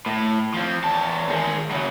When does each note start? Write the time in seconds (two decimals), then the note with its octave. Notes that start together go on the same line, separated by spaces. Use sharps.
0.06 A2
0.54 F3 C4
0.84 E2 A5
1.29 D#3 G#3
1.71 C#3 F#3